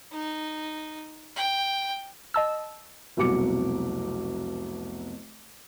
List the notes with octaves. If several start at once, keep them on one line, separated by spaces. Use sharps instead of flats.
D#4
G5
D#5 A5 E6
F1 C2 B2 F#3 D6 C#7